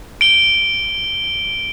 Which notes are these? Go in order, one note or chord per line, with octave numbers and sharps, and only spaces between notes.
D7 G7